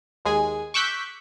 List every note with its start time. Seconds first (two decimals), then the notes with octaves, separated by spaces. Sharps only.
0.25 D#2 G#3 G#4 G#5
0.74 C#6 D6 E6 F#6 G6 B6